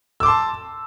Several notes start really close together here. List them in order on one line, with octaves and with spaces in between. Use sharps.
E6 D6 C6 A5